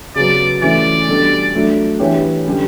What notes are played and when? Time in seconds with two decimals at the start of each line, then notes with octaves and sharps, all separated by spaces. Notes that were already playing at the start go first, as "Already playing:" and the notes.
0.15 C#3 F#3 B3 D5
0.61 E3 A3 C#4 D5
1.08 B2 G3 D4 A4
1.54 F#3 A3 D4
1.99 E3 B3 D4 G4 C#5
2.47 D3 G3 C#4 G4